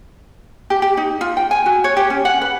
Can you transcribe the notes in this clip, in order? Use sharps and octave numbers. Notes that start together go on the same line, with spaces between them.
G4
G4
D#4
F4
G5
G#5
F#4
C#5
G4
C#4
F#5
B4